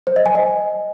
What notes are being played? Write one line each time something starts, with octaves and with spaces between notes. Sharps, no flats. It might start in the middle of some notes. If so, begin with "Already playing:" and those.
C5
D#5
G#5
D#5